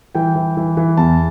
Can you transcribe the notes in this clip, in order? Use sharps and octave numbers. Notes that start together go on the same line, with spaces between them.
E3 G5
E3
E3
E3
E2 A5